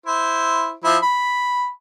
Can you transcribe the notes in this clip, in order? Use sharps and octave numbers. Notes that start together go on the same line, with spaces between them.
E4 C5
F3 E4
B5